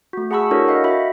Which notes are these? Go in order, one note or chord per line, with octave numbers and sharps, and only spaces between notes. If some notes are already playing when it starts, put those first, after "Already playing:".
A3 F#4
G#4 F#5 A5 B5 C#6 E6
D4 E4 F#4 A4 A#4 C#5
F#4 D#5 F5 F#5
F#4 E5 B5